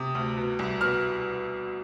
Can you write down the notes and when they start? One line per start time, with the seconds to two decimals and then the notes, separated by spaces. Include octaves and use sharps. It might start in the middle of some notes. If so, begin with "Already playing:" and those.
Already playing: C3 D#6
0.15 D2
0.37 B2
0.59 C2
0.81 B2 F6